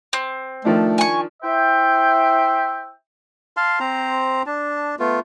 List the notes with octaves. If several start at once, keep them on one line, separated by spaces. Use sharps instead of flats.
C4
D#3 F3 A3 D4
G#5 C#6
E4 C5 E5 G5
F5 A5 C6
C4 C5 A#5
D4 A5
A3 B3 F4